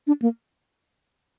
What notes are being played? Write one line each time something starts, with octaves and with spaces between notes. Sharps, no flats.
D4
A#3